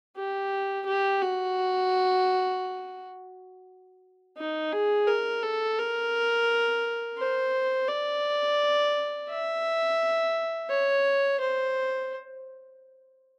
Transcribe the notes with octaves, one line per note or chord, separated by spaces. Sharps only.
G4
G4
F#4
D#4
G#4
A#4
A4
A#4
C5
D5
E5
C#5
C5